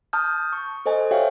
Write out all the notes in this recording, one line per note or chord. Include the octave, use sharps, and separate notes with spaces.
A5 D#6 F6 G6
C#6
A4 C5 D#5 G#5
G4 C#5 E5 F5 G5